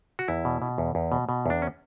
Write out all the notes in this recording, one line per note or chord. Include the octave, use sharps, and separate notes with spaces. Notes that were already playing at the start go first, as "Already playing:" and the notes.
F#4
E2 E4
B2
B2
E2
E2
B2
B2
E2 D4
C#4